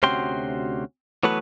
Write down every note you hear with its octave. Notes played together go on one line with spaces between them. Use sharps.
D2 C3 C#4 F#4 G5 C6
E3 F#3 A3 B3 B4